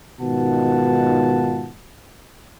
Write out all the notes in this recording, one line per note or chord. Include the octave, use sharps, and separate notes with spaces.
G#2 B2 D#3 F4 F#5 A5